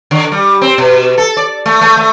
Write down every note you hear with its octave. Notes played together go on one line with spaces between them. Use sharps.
D3
G3
C4
B2
A4
D5
A3
A3
A3